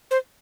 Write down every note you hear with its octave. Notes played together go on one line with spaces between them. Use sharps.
C5